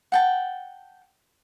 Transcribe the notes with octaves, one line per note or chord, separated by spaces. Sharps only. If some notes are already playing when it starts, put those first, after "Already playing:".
F#5 G5 A5